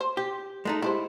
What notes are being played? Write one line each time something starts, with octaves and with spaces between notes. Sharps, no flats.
C5
G4
G#3 A3 D#4
G#3 E4 G4 C5